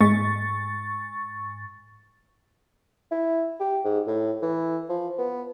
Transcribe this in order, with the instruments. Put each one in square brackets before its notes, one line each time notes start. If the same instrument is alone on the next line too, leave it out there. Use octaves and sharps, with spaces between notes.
[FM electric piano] G#2 C#6 A6 [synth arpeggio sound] G#3
[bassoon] E4
G4
G#2
A2
E3
F3
B3